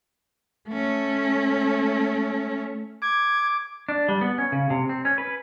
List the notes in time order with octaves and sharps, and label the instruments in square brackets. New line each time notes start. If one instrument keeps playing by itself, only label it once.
[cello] A3 C#4
[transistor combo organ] D6 [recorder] G#6
[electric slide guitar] D4
G3
B3
C#4
C#3
C3
C4
C#4
B4